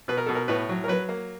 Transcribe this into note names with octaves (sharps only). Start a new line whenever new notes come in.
B2 B4
A#4
B2 A4
A#4
A2 B4
F#3
A#4
F#3 B4
A#3